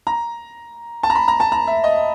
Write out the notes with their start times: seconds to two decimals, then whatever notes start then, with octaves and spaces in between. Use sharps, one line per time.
0.07 A#5
1.03 A5
1.10 A#5
1.15 B5
1.28 A#5
1.40 A5
1.52 A#5
1.67 E5
1.84 D#5